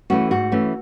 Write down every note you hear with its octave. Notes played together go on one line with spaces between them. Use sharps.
E3 A3 C#4 F#4
G#2 F#4
E3 A3 C#4